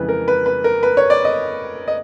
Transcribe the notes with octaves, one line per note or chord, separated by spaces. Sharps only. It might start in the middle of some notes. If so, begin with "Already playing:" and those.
Already playing: F2 C#3 E3 G#3 B4
A#4
B4
B4
A#4
B4
C#5
D5
D#5
D#5